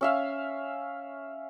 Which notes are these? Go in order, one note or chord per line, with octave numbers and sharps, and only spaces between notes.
C#4 E5 F5